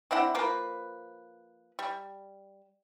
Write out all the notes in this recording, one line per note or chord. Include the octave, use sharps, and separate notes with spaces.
C4 D4 E4 F#5
F3 A#3 B4
G3